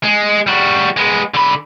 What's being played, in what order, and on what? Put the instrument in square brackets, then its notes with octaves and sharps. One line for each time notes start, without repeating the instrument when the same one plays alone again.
[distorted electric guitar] G#3
G3 F#4
G#3 B3
D3 B5